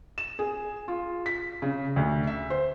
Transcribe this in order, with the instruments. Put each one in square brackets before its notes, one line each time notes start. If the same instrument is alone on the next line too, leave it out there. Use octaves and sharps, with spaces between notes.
[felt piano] E7
G#4
F4
B6
C#3
D2
E5
C5